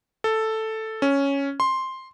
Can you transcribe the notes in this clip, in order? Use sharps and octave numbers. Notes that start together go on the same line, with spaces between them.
A4
C#4
C6